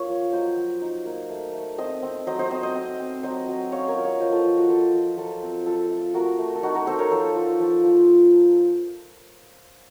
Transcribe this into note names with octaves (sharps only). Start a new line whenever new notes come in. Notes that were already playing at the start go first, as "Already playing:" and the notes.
Already playing: A#3 F4 C#5 F5
F3
F#3 C5 D#5
F#3
D#4
A#3
A3
A3
C4 C5 D#5
C4
F#3 C5 D#5
C5 D#5
C4 C5 D#5
C5 D#5
C4
C4
F#3 C5 D#5
F#3
C#4 C#5 F5
A#4 C#5
F4
C#5 F5
F3 C5 D#5
F4 A4
F3 F4
F#4
F3 F4 A4
F3
F#3 F4 A4
C4
F3 F4 A4
A3
A3 F#4 A#4
A3
A4
D#4 F#4
F#4 A#4
D#4 A4 C5
A#4 C#5
F3 A4 C5
F4
F3
F3